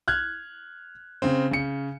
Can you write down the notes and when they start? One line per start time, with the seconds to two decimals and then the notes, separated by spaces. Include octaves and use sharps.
0.08 F6 F#6 G#6
1.22 C#3 C4
1.51 C#3 C#7